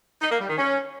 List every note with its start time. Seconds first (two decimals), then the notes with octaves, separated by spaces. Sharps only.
0.21 D#4
0.31 A#3
0.40 G3
0.49 D#3
0.58 C#4